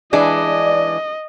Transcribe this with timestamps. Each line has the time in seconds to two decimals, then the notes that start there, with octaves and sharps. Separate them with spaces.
0.13 E3 G#3 D4 D5 D#5